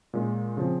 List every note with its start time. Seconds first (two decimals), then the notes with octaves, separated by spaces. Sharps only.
0.13 A#2 G#3 C#4
0.57 C#3 F3 C4